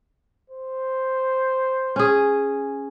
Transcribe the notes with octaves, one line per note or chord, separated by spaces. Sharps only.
C5
C#4 G#4